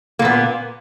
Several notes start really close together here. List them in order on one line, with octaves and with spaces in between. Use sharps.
A#3 A#2 B3